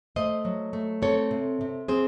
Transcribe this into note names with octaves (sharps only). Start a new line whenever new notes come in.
A3 C5 D#5
F#3
A3
C4 A4 C#5
C3
C3
C4 G#4 C5